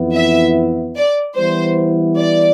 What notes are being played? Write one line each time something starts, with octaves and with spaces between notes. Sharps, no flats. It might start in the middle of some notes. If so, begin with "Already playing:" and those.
Already playing: F2 E3 B3 E4
E5
D5
E3 G3 B3 E4 C5
D5